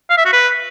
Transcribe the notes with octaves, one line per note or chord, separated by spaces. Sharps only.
F5
E5
F#4
B4